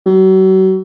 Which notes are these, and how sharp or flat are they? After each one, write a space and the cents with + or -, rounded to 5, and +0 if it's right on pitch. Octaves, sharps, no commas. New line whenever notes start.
F#3 +35